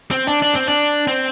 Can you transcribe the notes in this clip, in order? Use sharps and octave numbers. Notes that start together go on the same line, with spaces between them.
C4
D4
D4
C4
D4
C4